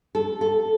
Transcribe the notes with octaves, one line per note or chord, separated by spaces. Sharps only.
A4
A4